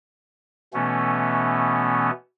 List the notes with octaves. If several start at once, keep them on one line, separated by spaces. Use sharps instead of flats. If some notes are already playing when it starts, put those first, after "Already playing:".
B2 E3 A3 B3 C#4